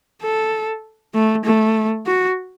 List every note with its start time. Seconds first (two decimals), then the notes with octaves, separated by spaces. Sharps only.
0.22 A4
1.14 A3
1.45 A3
2.06 F#4